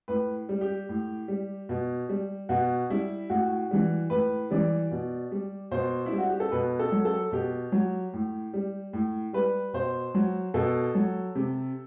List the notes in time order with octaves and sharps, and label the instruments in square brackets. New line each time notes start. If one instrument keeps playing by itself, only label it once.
[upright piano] A2 B4
G3
G4
A2
G3
B2
G3
B2 F#4
G3 E4
A2 F#4
E3 G3
A2 B4
E3 G3 D5
B2
G3
B2 C5
E4
G3
F#4
G4
A4
B2 B4
A4
F#3
A4
B2 G4
F#3
A2
G3
A2
G3 B4
B2 C5
F#3
B2 A4
F#3
C3